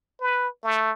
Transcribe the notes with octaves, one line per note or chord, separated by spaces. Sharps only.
B4
A3